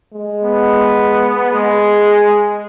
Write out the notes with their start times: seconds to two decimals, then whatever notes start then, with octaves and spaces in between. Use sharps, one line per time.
0.13 G#3
0.42 B3
1.54 G#3 G#4